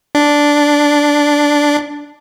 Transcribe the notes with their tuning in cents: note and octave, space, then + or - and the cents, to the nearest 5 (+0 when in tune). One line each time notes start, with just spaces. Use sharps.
D4 -5